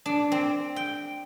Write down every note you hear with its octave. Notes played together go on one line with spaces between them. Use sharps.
D4
C4
G5